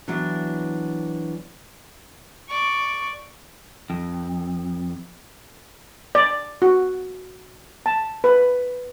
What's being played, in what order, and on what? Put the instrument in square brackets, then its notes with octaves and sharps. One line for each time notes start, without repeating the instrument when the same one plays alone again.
[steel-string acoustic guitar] E3 F#3 B3 D4
[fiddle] D5 C#6
[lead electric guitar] F2
[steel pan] D5
F#4
A5
B4